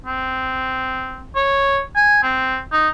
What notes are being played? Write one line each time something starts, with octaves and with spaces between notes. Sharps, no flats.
C4
C#5
G#5
C4
D#4